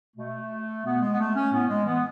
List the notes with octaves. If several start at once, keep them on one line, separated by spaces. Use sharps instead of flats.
B2 A3
B2 B3
G#3
B3
A3
C#4
A2 B3
G#3
E3 B3